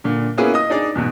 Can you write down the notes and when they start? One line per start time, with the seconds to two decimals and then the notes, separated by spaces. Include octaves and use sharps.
0.04 A#2 D3
0.37 A#3 B3 C#4 E4 G#4 B4
0.54 D#5 D#6
0.70 D4 D#4 G#4 D5
0.95 E2 G#2 B2